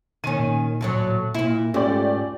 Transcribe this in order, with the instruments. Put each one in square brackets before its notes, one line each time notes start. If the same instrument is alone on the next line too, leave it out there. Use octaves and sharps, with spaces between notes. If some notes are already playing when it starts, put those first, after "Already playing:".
[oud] D#3 C#4 [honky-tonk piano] D#7
[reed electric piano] A#2
[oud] D2 A2 F#3
A#2 E4
[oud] G#2 [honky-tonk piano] A3 G4 D5 [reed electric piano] C#4 F4